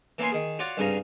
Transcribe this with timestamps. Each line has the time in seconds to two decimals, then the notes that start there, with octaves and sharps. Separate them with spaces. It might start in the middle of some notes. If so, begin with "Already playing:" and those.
0.18 E3 A#3 B3 C#4 G#5 C6
0.32 D#3 G#4
0.59 F4 F#4 C#5 D5 F#5
0.77 C2 G2 C#3 G#4 G#5 A#5